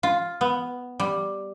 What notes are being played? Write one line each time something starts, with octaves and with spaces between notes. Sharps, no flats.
F4
B3
G3